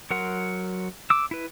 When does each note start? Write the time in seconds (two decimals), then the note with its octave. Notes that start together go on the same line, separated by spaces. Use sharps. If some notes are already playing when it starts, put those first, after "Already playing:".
0.11 F#3 A#4 F#5 C6
1.10 D6 E6
1.31 E4 B4